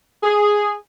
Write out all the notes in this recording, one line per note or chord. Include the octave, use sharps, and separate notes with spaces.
G#4